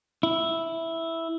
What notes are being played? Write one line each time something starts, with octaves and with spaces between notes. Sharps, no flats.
E4